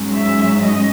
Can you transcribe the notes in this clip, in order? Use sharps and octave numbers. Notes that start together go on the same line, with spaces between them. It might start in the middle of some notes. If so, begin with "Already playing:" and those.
Already playing: G#2 F#3 C#4
E5
D#5